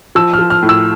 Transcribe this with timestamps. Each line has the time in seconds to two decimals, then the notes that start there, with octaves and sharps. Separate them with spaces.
0.15 F3 E6
0.33 F6
0.39 F3
0.50 F6
0.62 A2
0.69 E6